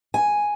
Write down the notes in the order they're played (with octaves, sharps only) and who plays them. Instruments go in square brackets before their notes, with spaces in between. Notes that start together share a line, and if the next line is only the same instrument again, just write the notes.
[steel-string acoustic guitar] G#5